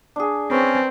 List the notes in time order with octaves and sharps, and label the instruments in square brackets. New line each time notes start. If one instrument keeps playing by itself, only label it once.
[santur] D4 G#4
[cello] C4 [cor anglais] C#4 [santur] B4 C#5 A5